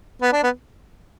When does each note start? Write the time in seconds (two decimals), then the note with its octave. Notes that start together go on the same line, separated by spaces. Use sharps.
0.22 B3
0.33 D4
0.43 B3